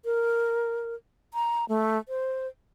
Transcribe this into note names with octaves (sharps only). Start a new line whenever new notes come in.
A#4
A#5
A3
C5